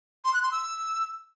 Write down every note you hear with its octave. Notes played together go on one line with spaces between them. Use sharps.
C6
F#6
C6
E6